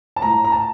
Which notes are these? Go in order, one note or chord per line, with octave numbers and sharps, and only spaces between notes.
A5
A2 A#5
A#5
A5